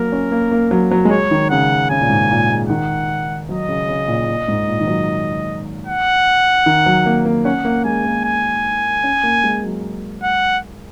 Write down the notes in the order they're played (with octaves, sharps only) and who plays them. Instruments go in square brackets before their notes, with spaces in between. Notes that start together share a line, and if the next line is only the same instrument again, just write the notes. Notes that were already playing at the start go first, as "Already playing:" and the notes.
Already playing: [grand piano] F#3 A#3 [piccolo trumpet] A#4
[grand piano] C#4
A#3
A#3
F#3
F#3
G#3
[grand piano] F#3 [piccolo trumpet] C#5
[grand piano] D#3
[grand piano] C#3 [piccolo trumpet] F#5
[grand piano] C#3 [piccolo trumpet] G#5
[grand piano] A#2
G#2
A#2
G#3
[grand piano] D#3 [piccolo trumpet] F#5
[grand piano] F#3 [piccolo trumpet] D#5
[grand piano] C#3
C#3
A#2
A#2
G#2
A#2
D#3
F#3
[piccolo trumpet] F#5
[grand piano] D#3
F#3
A#3
A#3
[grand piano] C#4 [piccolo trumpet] F#5
[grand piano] A#3
[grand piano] G#3 [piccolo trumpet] G#5
[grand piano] A#3
[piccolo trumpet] G#5
[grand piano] C#4
A#3
G#3
F#3
[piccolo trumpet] F#5